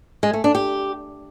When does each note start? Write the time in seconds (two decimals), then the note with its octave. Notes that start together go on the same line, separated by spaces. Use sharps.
0.23 G#3
0.33 A3
0.44 D4
0.55 G4